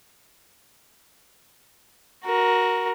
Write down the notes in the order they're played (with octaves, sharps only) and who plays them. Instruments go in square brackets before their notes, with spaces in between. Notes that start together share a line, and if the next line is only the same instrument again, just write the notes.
[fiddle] F#4 A#4